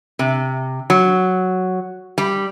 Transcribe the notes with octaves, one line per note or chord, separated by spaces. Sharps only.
C3
F#3
G3